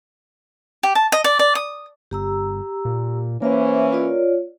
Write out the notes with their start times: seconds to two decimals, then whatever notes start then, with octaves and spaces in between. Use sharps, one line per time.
0.83 G4
0.95 A5
1.12 D#5
1.24 D5
1.39 D5
1.55 D#6
2.11 G1 G4 A#5 E6
2.85 A#2
3.42 E3 A#3 C#4 C5 E5
3.93 F4 C#5 D5